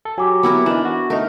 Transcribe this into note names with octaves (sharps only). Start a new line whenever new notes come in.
A4
F#3 G4 G#5 D6
B3 E4 A#4
E3 D4 D#4
F#4
A3 D#4 A#4